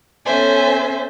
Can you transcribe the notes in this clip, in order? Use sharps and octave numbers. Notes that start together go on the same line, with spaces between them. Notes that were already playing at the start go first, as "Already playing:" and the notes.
B3 C#4 A4 C5 E5 G#5